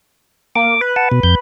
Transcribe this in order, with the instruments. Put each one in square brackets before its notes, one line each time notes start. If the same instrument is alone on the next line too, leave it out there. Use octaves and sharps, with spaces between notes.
[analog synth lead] A#3 [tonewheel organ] D6
[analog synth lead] B4
[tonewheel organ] F#5 A5
B2
F2 G6